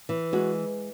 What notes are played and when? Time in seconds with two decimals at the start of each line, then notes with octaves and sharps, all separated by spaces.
0.09 E3
0.33 G#3 F#4